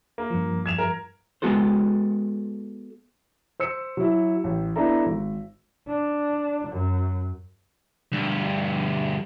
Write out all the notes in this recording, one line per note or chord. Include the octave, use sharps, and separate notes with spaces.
A#3
G2 F3
G#6 E7 F7
A#4
G#3 B3 F#4 A4 C5
C5 E6 C#7
F#3 E4
A1
B3 D4 E4 A4 A#5
G#1
D4
F#2
D2 G2